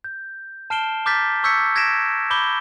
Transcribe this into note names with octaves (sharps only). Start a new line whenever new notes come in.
G6
A5 F6 C7 D7 E7 G7
A#5 D6 F6 G6 A6 B6
C#6 E6 G6 G#6 B6 C#7
G#6 A#6 B6 D7 E7
B5 D6 G6 G7